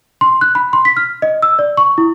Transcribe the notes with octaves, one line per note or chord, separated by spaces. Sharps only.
C6
F#6
B5
C6
B6
F6
D#5
E6
D5
C#6
E4